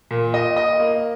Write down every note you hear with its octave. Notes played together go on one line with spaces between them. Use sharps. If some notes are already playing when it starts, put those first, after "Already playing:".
A#2
D#5
D#5
A#3